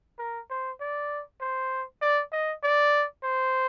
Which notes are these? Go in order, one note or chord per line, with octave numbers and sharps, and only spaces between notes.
A#4
C5
D5
C5
D5
D#5
D5
C5